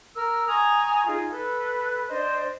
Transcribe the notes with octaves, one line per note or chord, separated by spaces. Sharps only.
A#4 E6 F6
G#5 A#5 C#6 D#6
D#4 F4 G#4
A4 B4
D4 C5 D#5